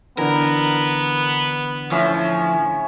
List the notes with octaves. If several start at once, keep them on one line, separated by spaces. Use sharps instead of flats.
D3 E3 B3 A#4
A2 F3 C#4 E5